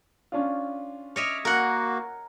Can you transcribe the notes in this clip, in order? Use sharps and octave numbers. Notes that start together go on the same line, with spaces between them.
C#4 D4 F4
C#5 D#5 E5 D6 F6
A#3 F#4 A#4 F#5